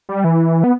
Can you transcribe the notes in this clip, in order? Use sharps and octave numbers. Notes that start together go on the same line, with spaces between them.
G3
E3
B3